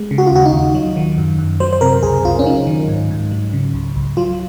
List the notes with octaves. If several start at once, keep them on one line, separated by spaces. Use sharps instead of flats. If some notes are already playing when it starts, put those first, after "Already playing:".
Already playing: G#3
C#3
F#4
F4
D#2 F#4
D#4
D#2
F#3
D#3
F#2
F#2
F#3 C5
C5
C3 A#4
C#2 G#4
C#2 F4
C#4
F#3 D#4
D#3
G#2
G#2
F#3
C#3
C#2
C#2
F#3 F4